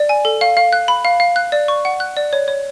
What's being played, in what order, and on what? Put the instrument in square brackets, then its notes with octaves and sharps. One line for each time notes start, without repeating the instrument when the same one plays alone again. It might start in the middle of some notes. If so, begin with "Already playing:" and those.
Already playing: [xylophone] D5
G#5
A4
F5
F5
F#6
B5
F5
F5
F#6
D5
C#6
F#5
F#6
D5
C#5
C#5